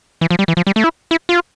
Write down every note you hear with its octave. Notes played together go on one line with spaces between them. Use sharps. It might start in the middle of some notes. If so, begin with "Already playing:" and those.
E3
F3
G3
E3
F3
G3
A3
E4
E4
F4